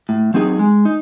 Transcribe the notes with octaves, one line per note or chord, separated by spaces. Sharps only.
A2
F#3 C4 D#4 G#4
G#3
D#4